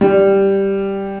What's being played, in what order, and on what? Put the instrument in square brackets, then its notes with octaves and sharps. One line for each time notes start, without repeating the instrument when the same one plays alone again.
[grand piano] G3